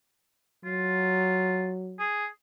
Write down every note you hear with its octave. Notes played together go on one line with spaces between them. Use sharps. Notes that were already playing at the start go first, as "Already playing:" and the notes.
F#3 F4
G#4